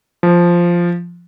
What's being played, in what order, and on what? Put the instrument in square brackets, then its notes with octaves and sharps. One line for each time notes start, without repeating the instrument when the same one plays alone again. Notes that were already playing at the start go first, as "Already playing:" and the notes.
[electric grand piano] F3